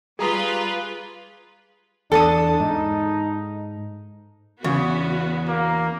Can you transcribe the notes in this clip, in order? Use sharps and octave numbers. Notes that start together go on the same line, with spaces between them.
G3 F4 G#4 B4 A#5 D#6
E2 D4 A4 A5 D#6
G#2 D#4
E2 C#3 B3 F#4
A#3